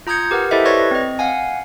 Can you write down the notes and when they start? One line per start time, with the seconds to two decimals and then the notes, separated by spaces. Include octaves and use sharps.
0.07 F4 A#5 D#6 G6 G#6 C#7
0.31 G4 A#4 B4 F#5
0.51 E4 G4 A4 C5 D#5 E5
0.65 B4 C#5 D5 C#6 G#6 A#6
0.91 C4 D#5
1.19 F5 F#5 G#5